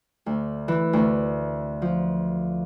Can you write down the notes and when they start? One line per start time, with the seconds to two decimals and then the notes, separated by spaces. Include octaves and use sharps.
0.26 D2
0.68 E3
0.93 D2
1.82 F3